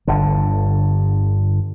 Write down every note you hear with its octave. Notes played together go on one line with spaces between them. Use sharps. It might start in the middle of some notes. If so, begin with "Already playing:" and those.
G1 D3